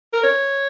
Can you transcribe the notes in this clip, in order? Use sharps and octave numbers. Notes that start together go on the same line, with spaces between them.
A#4
C#5